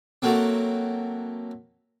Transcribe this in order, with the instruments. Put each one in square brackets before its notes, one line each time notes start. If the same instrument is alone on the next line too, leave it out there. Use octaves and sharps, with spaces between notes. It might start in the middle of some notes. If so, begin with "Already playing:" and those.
[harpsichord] F#3 A3 A#3 C4